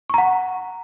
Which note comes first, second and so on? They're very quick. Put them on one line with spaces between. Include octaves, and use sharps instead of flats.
C#6 A#5 F#5